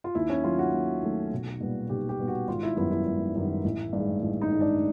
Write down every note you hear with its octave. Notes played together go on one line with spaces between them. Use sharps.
F4
D#2 E4
C#4
D#3 F#3 A3 F4
F#4
D#2
D#3 F#3 A3
B1
A#2 G3 B3
B1 G4
G4
A#2 G3 B3
F#4
G#1 F4
E4
F#2 D#3 G3 B3 E4
E4
G#1
F#2 D#3 G3 B3
A1
G2 D#3 G#3
A1
D#4
G2 D#3 G#3
D4